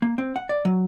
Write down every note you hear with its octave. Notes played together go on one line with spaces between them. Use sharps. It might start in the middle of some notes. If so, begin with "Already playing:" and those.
A#3
C4
F#5
D5
F#3